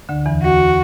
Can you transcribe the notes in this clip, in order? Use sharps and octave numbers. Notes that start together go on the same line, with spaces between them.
D2 D3
E2 E3
F#4